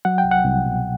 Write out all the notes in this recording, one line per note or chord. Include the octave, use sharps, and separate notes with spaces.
F#3 F#5
G5
C2
F#5
C2
B2